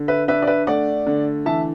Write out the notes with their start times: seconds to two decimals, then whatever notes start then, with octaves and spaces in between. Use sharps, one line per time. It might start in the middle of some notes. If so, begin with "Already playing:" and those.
Already playing: D3
0.08 B4 E5
0.28 D4 B4 E5
0.42 D5
0.47 B4 E5
0.67 A3 D5 F#5
1.06 D3
1.46 E3 E5 A5